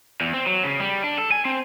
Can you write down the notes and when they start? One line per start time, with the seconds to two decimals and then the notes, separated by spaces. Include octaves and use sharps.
0.21 E2
0.33 C4
0.47 F#3
0.64 C#3
0.80 G3
1.04 D4
1.18 A4
1.32 G#5
1.45 C4